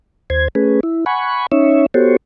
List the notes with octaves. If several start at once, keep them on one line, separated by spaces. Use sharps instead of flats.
D#2 C5 G#6
A3 C#4 G#4 B4
E4
F#5 G#5 B5 C#6
C#4 D#4 C#5 E5
B3 F#4 G4 A4 C5 C#5